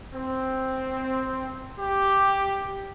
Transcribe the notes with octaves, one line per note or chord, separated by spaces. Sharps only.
C4
G4